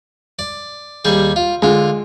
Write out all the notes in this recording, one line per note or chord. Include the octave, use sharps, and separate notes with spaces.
D5
D#2 G3 G#4
F4
D3 G#3 F4